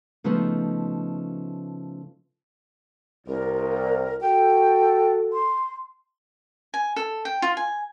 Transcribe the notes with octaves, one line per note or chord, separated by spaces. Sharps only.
C#3 F3 A3 B3 D#4
C2 A#4
F#4 A4 G5
C6
G#5
A4
G5
F4
G#5